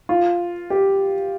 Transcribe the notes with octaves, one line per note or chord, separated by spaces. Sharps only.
F4
G4